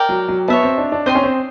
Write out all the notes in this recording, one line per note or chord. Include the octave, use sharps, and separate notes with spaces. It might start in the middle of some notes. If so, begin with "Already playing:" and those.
Already playing: A#4 D5 G5
F#3
F#3
B3 C#5 E5 A5
C4
D4
D4
C4 C5 D#5 G5 C6
C#4
C4